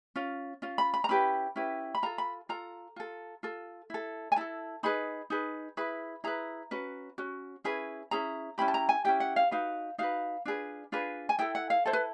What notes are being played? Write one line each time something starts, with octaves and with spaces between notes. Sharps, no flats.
C#4 F4
C#4 F4
B5
B5
A#5
C#4 E4 G4 B4 B5
C#4 E4 G4 B4
B5
F4 A4 A#5
B5
F4 A4 A#5
F4 A4
F4 A4
E4 A4
G#5
E4 A4 A5
D#4 G#4 B4 B5
D#4 G#4 B4
E4 G#4 B4 B5
E4 G#4 B4 A#5
C#4 F#4 B4
C#4 F#4
C#4 E4 G#4 B4
C#4 E4 G#4 A#5
C#4 E4 G4 B5
A5
A#5
G#5
C#4 E4 G4 G5
F#5
F5
D#4 F#4 B4 F5
D#4 F#4 B4 F5
D4 F4 G#4 B4
D4 F4 G#4 B4
G#5
E4 A4 G5
F#5
F5
E4 A4 C5
B4